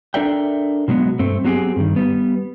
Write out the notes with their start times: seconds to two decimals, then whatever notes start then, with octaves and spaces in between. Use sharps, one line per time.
0.14 D4 A4 A#4 D5 E5 G5
0.88 B2 F#3 G#3 B3
1.19 G2 A3 C4
1.44 F#3 B3 C4 G4 G#4
1.76 G2 D#3
1.96 G3 B3